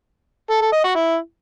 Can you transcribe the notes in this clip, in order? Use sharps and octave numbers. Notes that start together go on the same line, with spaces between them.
A4
A4
D#5
F#4
E4